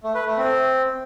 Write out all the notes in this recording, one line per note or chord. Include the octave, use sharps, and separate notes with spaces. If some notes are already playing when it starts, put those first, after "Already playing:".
A3
B4
A3
C4